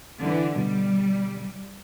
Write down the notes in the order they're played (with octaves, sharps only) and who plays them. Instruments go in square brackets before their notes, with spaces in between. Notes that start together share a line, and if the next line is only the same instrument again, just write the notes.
[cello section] D3 E3
[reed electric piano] B2 D3 [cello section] G3